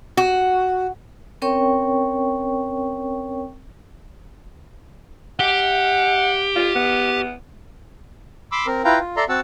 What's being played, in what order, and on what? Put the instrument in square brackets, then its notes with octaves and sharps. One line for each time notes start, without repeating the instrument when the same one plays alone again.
[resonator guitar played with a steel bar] F#4
[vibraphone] C4 C#4 A#4 C#5 G5 C#6
[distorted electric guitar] G4 [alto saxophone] F#5
[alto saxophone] F4
B3
[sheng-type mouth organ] B5 C6 D6 E6
C4 A#4
E4 F4 B4 F5 G5 A#5
F4
A4 D5 E5 A#5 C6
C4 F#4 F#5 A5 E6